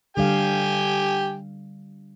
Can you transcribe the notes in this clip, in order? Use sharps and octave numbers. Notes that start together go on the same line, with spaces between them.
D3 G3 G4 F5 G5 G#5